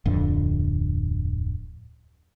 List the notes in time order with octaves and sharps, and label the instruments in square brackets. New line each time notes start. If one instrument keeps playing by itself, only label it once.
[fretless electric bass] D1 F2 D3